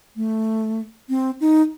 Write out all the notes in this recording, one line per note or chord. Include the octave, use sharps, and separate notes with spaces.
A3
C4
D#4